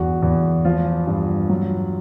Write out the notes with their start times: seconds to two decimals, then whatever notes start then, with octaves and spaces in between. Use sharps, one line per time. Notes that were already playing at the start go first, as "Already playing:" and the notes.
Already playing: E2 G2 F#4
0.22 E2
0.65 F3 F4
1.07 G2
1.50 F#3